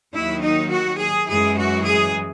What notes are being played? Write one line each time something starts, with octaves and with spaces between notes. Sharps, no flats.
D#2 D#3 F#3 E4
D#4
F#4
G#4
F#2 E3 G#3 G#4
F#4
G#4